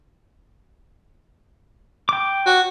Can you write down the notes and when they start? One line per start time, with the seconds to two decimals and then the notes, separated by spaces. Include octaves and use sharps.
2.09 G5 D6
2.46 F#4